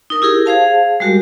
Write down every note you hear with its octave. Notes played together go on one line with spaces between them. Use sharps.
D#4 A#4
E4 G4 G#4 A#4
G#4 C5 F5 A5
G3 G#3 F#4 G4 A#4